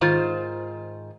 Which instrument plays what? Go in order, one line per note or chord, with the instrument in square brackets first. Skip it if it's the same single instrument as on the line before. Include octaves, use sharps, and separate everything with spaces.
[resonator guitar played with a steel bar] G#2 D#3 F4 C5